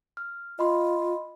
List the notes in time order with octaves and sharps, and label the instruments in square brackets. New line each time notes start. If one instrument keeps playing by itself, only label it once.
[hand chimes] F6
[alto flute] F4 [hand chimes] D#5 B5 C6